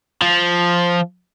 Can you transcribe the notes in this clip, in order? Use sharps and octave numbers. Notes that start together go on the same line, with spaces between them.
F3